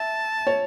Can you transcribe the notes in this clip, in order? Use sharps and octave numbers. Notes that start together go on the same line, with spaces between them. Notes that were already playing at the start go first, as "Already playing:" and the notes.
Already playing: E5 A5
C#5